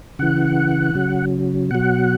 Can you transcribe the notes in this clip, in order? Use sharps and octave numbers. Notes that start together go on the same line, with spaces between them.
C#3 E3 F#5
C#3 F#3
B2 F#3 F#5